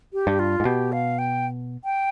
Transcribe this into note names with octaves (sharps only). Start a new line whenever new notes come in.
G4
G2
F4
G#2
B2 G4
F5
G5
G5